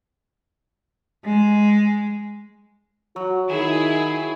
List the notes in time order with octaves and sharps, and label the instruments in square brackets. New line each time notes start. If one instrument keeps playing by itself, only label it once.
[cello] G#3
[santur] F#3 [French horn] F#4
[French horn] D#3 [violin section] E4 G#4